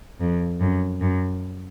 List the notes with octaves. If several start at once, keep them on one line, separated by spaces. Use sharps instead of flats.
F2
F#2
F#2